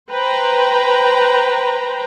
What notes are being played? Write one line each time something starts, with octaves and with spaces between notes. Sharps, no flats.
B4 C5 G5 A#5